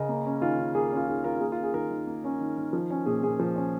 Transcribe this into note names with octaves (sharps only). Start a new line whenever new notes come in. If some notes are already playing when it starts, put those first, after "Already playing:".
Already playing: C#3 A#4 D#5
A#3
C#4
D#3 F4 A#4
D#3
A#3 G#4
G#4
C#4 F4
D#3 G#4
D#3 F4 A#4
F4
A#3 G#4
F4
C#4
G#4
D#3 F4 A#4
D#3
A#3
C#4
D#3
D#3
F3
C#4
A#2 G#4
A#2 G#4
F3
C#4